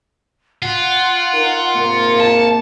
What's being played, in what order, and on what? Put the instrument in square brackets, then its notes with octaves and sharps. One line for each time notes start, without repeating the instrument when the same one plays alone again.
[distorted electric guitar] F4 [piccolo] F#5
[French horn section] D#4 A#4
[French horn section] G#2 C3 A#3 [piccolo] C#7
[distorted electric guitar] A5